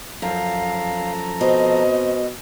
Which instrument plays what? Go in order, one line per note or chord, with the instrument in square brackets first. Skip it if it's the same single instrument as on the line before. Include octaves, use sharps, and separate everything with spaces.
[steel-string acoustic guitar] F#2 [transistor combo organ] F3 A4 A#5 [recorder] F5
[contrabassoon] B2 [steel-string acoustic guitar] C4 [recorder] D#5